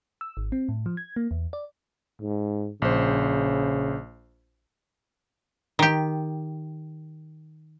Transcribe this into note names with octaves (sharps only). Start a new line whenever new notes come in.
E6
G#1
C4
A2
F3
G#6
A#3
E2
D5
G#2
A#1 C#3 C5
D#3 G4